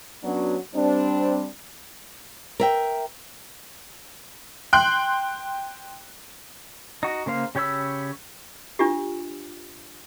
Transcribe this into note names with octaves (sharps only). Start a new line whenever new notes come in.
F#3 B3 C#4 D4 F#4
G3 C4 D4
A#4 E5 G5
G5 C6 F#6
D#4 F#4
C#3 A#3 C5 F5
C#3 G4 C#5 B5 E6
D4 F4 G4